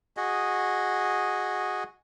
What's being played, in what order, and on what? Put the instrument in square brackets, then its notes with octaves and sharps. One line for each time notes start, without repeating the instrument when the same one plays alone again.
[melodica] F#4 G#4 D#5